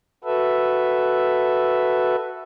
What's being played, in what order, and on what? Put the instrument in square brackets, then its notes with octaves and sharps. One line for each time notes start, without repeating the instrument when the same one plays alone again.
[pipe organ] F#4 A4 B4 E5